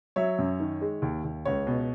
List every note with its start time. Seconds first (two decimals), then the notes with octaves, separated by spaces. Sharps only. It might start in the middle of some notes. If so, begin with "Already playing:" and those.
0.16 F#3 C#5 E5
0.39 F#2
0.60 D#3
0.81 G#3
1.02 D#2
1.24 D#2
1.45 C#2 C#5
1.67 B2